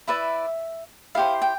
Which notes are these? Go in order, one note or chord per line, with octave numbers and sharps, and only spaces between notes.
E4 B4 D5 E5
E4 G4 C5 F5
G5